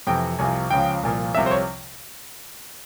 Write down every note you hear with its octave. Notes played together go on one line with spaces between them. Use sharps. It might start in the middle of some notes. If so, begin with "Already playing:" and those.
F2 C3 E3 G5
C2 C3 F3 G#5
C#2 C#3 F3 G5
C2 A#2 F3
C2 C3 F3 E5
C5
C#5